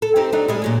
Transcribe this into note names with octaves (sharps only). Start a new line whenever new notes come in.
A4
C4 D#4 G4
F#3 D4 D#4
G3 G#3
A#2 F#3 G#3